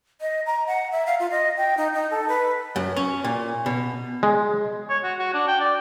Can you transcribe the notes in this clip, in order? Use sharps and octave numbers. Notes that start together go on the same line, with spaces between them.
D#5
A#5
F#5
E5
F5
F4
D#5
G5
D#4
D#4
A4
B4
F#2
C#4
A#2
B2
G#3
C#5
F#4
F#4
D4
G5
D5